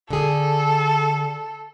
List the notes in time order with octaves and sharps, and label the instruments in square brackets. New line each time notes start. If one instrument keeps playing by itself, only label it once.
[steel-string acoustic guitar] D3 G#4 [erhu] A4